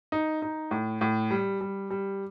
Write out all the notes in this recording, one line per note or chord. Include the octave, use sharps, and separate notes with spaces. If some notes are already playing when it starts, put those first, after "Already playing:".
D#4
D#4
A2
A2
G3
G3
G3